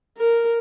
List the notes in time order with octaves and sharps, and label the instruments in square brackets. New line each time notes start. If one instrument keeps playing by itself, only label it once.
[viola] A#4